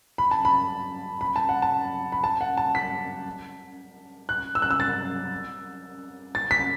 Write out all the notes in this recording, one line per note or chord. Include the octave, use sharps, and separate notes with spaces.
B5
A5
B5
B5
A5
F#5
A5
B5
A5
F#5
A5
B6
F#6
E6
F#6
E6
A6
A6
B6